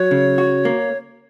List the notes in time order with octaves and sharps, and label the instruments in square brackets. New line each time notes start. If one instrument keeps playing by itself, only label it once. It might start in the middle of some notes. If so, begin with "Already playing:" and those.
Already playing: [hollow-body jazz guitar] F#3 [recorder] C#5
[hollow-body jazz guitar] C#3
F#4
A#3